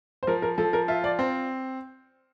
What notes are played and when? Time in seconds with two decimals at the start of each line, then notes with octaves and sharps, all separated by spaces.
0.23 C5
0.27 F3 A#4
0.42 A#4
0.58 F3 A4
0.73 A#4
0.88 F4 E5
1.04 D5
1.19 C4 C5